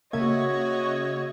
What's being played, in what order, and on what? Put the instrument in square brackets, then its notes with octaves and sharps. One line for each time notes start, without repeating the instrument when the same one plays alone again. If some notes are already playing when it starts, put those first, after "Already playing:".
[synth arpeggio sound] C#3 E5 G#6 [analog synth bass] A#3 [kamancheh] F#4 C#5 [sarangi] D#5